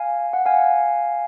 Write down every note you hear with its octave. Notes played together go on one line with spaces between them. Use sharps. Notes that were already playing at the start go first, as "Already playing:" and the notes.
Already playing: F5 G#5
F#5
F5 G#5